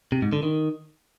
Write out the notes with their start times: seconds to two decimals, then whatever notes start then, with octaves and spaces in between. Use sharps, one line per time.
0.12 C3
0.22 G#2
0.33 D3
0.43 D#3